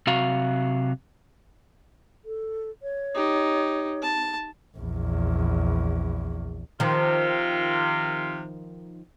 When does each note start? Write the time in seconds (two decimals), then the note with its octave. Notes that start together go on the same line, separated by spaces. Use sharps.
0.07 C3 F#3 F#4 F5
2.25 A4
2.82 C#5
3.15 D#4 G4
4.02 A5
4.77 A#1 E2
6.80 C3 D#3 F3 F4